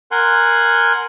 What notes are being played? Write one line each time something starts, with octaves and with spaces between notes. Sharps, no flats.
A#4 F#5 G#5 C6